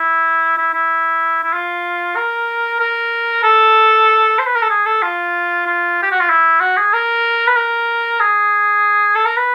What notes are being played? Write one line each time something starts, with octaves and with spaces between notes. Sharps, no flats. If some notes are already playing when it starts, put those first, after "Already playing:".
Already playing: E4
E4
E4
E4
F4
A#4
A#4
A4
C5
B4
A#4
A4
G#4
A4
F4
F4
G4
F#4
F4
E4
F#4
G#4
A#4
B4
A#4
G#4
A4
A#4
B4